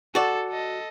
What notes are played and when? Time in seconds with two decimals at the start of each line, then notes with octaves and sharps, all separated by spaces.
0.15 F#4 A4 D5
0.50 A4 D#5